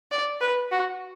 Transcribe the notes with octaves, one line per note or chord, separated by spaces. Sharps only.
D5
B4
F#4